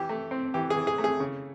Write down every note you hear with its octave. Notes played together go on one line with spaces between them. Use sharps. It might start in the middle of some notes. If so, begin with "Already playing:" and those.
Already playing: E3 G4
A3
C4
E3 G4
G#4
E3
G#4
A3
G#4
C#3